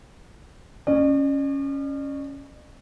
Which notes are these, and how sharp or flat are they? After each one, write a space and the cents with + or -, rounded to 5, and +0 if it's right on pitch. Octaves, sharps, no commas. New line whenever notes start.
C#4 +0 D5 +45